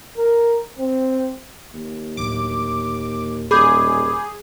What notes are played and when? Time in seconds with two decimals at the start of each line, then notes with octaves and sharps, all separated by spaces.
0.18 A#4
0.79 C4
1.74 D#2
2.17 D1 D6
3.51 D#1 G#4 B5 D6 G6